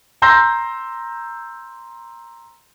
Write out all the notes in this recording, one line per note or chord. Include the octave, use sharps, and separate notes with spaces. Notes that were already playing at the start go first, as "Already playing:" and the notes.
A#5 C6 E6 G6 A#6